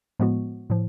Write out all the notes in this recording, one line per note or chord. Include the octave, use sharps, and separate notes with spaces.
A2 F3 G#3 B3 F#4
A2 F3